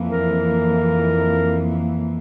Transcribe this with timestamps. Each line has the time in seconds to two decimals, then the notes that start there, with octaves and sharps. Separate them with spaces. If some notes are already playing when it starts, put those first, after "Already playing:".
Already playing: F2 E3 A#3
0.09 A#4